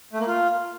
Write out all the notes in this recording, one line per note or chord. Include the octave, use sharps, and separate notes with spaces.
A3
A#3
F4